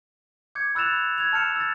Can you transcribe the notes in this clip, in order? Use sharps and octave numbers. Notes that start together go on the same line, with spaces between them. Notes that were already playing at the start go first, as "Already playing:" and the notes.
D6 G6 G#6 C#7
B5 E6 F#6 A6 E7 F7
G#6 F7
A5 F6 G6 C#7 E7 F7
E6 A6